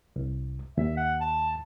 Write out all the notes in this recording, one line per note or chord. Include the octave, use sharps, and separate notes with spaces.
C2
D#2 E5
F#5
A5